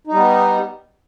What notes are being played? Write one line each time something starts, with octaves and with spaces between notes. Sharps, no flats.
G3 B3 D#4